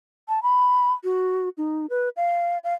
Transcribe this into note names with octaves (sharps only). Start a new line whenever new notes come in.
A5
B5
F#4
D#4
B4
F5
F5